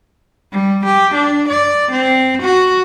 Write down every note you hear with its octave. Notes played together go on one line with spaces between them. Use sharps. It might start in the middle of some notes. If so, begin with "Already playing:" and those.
G3
G4
D4
D5
C4
F#4